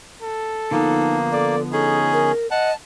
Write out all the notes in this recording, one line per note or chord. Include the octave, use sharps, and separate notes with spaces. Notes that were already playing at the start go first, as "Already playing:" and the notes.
A4
D3 F3 A#3 B3 D#4
A4 D5
C#4 D#4 G#4 A4
A#4
D#5 F#5 A5